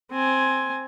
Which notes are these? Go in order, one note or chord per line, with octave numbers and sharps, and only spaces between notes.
C4 G#5